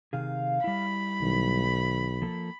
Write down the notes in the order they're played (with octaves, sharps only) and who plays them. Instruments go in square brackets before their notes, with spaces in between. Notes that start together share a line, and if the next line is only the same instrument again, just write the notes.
[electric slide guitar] C3 D#3 G#4 [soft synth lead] F5
[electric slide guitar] G3 E4 [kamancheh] B5
[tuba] B1 [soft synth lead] D#3
[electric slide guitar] F3 A#3 A4